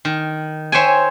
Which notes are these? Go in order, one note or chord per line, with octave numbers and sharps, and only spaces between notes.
D#3
C5 C#5 E5 G5 G#5